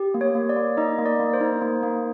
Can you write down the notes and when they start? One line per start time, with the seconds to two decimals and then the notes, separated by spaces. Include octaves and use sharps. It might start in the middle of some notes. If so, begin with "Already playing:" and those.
Already playing: G4
0.14 A#3
0.21 C#5
0.35 A#3
0.49 D5
0.56 A#3
0.77 D#4 D#5
0.99 A#3
1.05 D5
1.20 A#3
1.33 C5
1.41 D#4
1.61 A#3
1.83 A#3